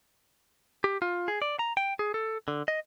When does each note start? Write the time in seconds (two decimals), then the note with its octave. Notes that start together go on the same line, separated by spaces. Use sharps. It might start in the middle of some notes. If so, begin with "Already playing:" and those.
0.84 G4
1.02 F4
1.28 G#4
1.42 D5
1.59 A#5
1.77 G5
1.99 G#4
2.14 A4
2.48 D3
2.68 D#5